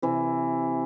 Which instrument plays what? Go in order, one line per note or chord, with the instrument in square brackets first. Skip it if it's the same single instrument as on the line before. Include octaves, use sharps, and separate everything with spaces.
[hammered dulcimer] C3 E3